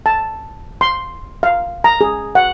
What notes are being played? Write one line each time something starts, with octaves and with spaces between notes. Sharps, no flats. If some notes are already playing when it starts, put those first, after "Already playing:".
A5
C6
F5
A#5
G#4
F#5